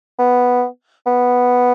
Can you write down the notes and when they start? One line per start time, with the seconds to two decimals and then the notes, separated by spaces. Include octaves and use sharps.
0.19 B3
1.07 B3